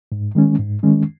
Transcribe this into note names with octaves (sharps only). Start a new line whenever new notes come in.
G#2
D#3 G#3 C#4
G#2
D#3 G#3 C#4